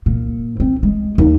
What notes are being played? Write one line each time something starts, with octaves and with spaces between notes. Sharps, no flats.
A#2
C4
G#3
D#2